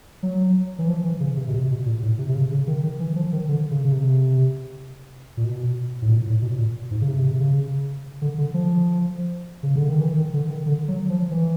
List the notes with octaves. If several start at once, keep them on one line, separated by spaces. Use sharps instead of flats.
F#3
E3
F3
E3
C#3
C3
B2
C3
B2
A#2
A2
C3
C3
C#3
C#3
D#3
D#3
E3
F3
D#3
D3
C#3
C#3
C3
A#2
B2
A2
A#2
A2
B2
A#2
G#2
C#3
C3
C3
C#3
D3
D3
F3
C#3
D3
D#3
E3
D#3
D3
D#3
D3
F#3
F3
E3